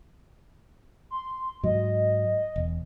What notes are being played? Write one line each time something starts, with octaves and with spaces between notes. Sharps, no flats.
C6
G#2 F#3 D#5
E1